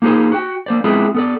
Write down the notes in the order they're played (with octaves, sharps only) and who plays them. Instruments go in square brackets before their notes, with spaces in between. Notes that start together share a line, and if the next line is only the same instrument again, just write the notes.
[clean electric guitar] A#3 D#4 F4 G#4 C5
F#4 G5
A#3 C5 D5
G#3 B3 C4 E4 F4 G#4
B3 A4 D5